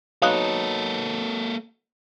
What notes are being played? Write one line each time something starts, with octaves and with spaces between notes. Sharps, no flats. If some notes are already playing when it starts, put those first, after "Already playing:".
F#3 A#3 B3 D#4 A4 F5 D#6 F#6